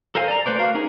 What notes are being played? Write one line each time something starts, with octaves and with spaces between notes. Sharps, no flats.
A4 A#4 C5 F5 G#5
D5 A#5
A3 B4 C5 D5
F#4 A#4 F5
C#4 D#4 G#4 A#4